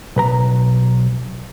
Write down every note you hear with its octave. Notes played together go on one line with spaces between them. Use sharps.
B1 B4 A#5